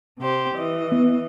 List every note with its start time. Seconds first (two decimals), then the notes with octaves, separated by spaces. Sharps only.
0.19 C3 G4 C5
0.56 E3 D#5
0.92 B3